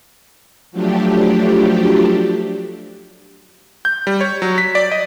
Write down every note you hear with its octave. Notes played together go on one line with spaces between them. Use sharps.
F3 F#3 A3 D4 G4
G6
G3
C#5
F#3
B6
D5
D#5